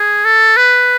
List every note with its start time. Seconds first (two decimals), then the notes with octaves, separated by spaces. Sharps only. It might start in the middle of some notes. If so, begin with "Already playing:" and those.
Already playing: G#4
0.25 A4
0.57 B4